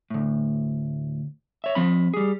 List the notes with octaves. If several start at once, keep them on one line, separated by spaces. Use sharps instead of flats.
D2 A2
C#5 E5
F3 C4 B5
G3 G#4